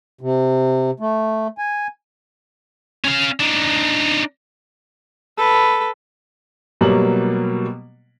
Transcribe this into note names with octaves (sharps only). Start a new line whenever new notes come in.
C3
A3
G#5
C#4 F5
D4 D#4
A4 B4
B2 F#3 G3 A#3 F#7